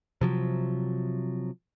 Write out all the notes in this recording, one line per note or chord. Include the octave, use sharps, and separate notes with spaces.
C3 F3 F#3